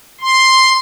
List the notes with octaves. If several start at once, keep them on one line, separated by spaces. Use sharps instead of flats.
C6